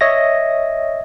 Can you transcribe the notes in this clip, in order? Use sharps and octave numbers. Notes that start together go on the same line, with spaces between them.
C#5 D#5 E5 A#6